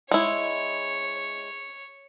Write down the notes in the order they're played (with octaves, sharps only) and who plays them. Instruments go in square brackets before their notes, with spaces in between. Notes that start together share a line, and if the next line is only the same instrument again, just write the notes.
[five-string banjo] G#3 E4 [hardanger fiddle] C#5